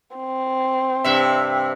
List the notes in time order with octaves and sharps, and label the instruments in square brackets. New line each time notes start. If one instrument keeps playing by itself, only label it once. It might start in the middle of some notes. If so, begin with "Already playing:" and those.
[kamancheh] C4
[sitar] G2 C3 E5